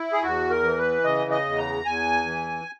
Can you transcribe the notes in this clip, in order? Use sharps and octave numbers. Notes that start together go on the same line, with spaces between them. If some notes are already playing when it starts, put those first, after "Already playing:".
Already playing: E4
G#4
E2 F#4
A#4
E3
B4
C#3 D#5
D#5
E2
A#5
E2 G#5
E3